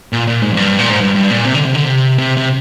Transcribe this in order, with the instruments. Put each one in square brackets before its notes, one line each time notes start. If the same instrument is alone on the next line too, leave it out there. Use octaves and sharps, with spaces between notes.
[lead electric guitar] A#2
A#2
G#2
F2
G2
A#2
G#2
G2
G2
A#2
C3
D3
C3
D3
C3
C3
C3